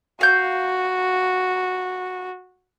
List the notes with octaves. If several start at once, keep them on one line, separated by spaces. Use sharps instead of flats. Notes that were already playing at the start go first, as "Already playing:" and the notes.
F#4 F5 G6